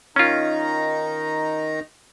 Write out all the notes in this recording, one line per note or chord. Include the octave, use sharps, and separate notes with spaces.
D#3 C#4 D#4 F4 A#5